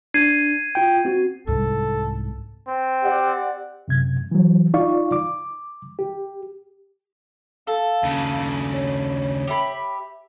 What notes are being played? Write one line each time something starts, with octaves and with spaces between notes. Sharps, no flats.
D4 G#6 C7 D#7
F4 G5
C4 F#4
C2 G#2 A4
C4
G4 D5 F#5
F#2 C3 G#6
E3 F#3
D#4 F4 D5 F5 C#6
D6
G4
A4 F5
D#2 C#3
C#5
G4 E5 B5